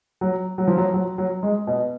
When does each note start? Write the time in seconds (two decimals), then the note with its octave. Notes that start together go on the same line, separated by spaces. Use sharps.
0.21 F#3
0.58 F#3
0.67 F3
0.78 F#3
0.94 F#3
1.18 F#3
1.43 G#3
1.67 B2